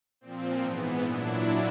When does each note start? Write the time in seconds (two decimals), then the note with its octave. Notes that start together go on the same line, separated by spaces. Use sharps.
0.21 A#2 F3 C4
0.62 G#2 E3 B3
1.03 A#2 F#3 D4 E4